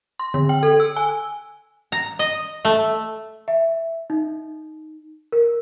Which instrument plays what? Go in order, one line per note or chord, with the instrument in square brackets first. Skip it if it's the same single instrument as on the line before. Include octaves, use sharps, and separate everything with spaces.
[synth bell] C6
D3
G5
A4
E6
G#5
[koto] A#5
D#5
A3
[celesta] E5
D#4
A#4